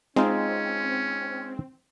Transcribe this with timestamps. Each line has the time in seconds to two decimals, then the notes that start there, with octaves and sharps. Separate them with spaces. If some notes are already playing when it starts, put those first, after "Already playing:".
0.16 G#3 C4 C#4 D#4 F4